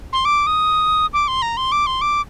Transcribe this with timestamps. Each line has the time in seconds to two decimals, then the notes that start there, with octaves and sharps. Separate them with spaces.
0.13 C6
0.25 D6
0.47 D#6
1.13 D6
1.28 C6
1.42 A#5
1.57 C6
1.72 D6
1.87 C6
2.01 D6